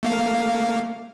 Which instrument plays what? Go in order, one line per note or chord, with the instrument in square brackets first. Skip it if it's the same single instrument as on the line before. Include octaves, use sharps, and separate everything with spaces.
[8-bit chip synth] A3 A#3 F5